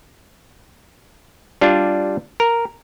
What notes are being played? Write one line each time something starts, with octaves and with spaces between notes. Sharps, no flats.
G3 D4 F4
A#4